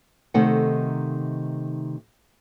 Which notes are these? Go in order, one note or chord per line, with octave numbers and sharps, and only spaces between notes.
C3 D#3 A3 D#4 A4 F#5